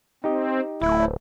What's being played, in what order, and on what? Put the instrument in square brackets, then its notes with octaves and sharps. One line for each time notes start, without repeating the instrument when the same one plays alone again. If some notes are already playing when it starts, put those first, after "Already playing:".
[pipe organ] C4 [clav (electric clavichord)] D#4 G4 D#5
[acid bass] D1 [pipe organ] A3 [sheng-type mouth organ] E4